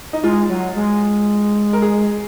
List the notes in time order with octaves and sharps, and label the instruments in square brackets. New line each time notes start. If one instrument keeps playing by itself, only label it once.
[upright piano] D#4
[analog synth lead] G#3 [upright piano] F4
[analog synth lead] F#3
G#3
[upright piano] A#4
G#4